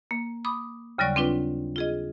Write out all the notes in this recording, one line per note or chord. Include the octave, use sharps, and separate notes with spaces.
A#3
B5 D6 D#6
D#2 C#3 F#3 G3 D5 C#6
C4 D4 F4 B4
F4 G#4 D#5